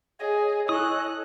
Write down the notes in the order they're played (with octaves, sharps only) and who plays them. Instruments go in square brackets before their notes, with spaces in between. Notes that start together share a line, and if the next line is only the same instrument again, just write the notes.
[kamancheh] G#4 [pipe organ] C#5 D#5 G#5
[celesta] E4 C#6 [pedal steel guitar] A4 D#6 [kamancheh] F#6